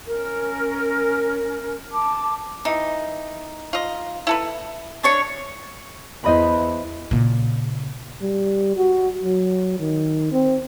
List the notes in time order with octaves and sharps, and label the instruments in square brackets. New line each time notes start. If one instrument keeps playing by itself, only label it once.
[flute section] C#4 A#4
A5 D6
[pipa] E3 [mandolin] D#4
[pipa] F4 D#5
E4 A4 B4
[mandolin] D4 C#5 C#6
[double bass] E2 [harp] C5 D#5 B5
[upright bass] A#2 C#3
[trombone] G3
F#4
F#3
D#3
C4